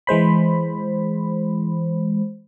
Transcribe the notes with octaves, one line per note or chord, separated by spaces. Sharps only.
E3 G#3 C5 B5